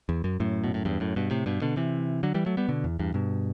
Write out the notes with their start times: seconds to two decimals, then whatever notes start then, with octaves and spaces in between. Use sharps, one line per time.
0.09 E2
0.24 F#2
0.40 F#2 A2
0.64 B2
0.74 A2
0.85 E2 G2
1.00 F#2 A2
1.16 G2 B2
1.31 A2 C3
1.46 G2 B2
1.62 B2 D3
1.77 C3 E3
2.23 D3 F#3
2.34 E3 G3
2.46 F#3 A3
2.57 G3 B3
2.68 B2 D3
2.84 E2
2.99 E2 G2
3.14 G2 B2